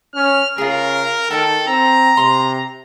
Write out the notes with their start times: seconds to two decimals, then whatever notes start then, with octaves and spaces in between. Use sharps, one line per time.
0.15 C#4 F6
0.58 C#3 F4 G#4 A#4
1.30 D#3 A4 G5 A5
1.68 C4 A#5
2.17 C3 C6